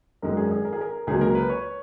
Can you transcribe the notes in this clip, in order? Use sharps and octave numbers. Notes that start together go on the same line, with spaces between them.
G#1 F#2 D#3 G#3 A#4
G#4
G#4
A#4
G#4
A#4
C#2 C#3 F#3 A#3 G#4
A#4
B4
C#5